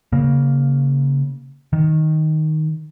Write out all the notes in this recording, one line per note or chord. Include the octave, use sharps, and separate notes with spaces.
C#3 A#3
D#3